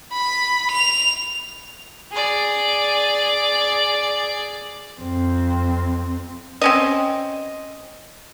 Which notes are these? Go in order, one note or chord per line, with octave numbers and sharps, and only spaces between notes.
B5
F7
G#4 D5
F2 C4
C4 C#4 D#5